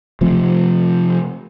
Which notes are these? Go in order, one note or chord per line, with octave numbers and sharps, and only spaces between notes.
C3 F3 A3 C4